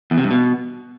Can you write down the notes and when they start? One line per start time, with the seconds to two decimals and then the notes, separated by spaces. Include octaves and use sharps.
0.11 E2
0.18 C3
0.24 G2
0.31 B2